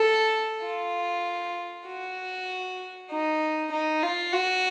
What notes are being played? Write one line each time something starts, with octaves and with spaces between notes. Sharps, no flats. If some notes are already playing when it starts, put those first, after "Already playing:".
Already playing: A4
F4
F#4
D#4
D#4
F4
F#4